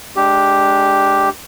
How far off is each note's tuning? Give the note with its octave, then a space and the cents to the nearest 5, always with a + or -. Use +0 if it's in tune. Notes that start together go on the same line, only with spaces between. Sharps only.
G#3 +20 D4 +0 G4 +0